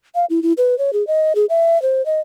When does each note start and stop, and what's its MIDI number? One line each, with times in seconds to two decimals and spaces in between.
0.15 0.25 77
0.30 0.42 64
0.43 0.53 64
0.58 0.78 71
0.78 0.91 73
0.93 1.06 68
1.07 1.33 75
1.35 1.46 68
1.49 1.81 76
1.82 2.04 72
2.06 2.20 75